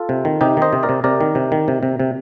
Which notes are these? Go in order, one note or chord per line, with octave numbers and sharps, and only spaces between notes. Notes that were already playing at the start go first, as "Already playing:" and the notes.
Already playing: F4 A4
C3
D#3
C3 D#4 G4
D#3 C5 D#5
C3
A#4 D5
C3
C3 A#4 D5
D#3
C3
D#3
C3
C3
C3